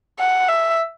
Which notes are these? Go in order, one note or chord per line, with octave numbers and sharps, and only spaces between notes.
F#5
E5